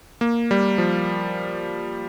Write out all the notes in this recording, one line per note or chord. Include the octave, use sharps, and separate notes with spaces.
A#3
G3
F3